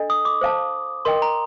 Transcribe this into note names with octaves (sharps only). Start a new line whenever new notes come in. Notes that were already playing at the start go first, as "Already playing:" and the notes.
Already playing: D4 A4 D#5
D#6
D6
C5 F5 A5
A#4 D#5 G5 C6
A#5